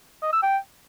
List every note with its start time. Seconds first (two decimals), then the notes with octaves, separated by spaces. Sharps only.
0.23 D#5
0.33 E6
0.43 G5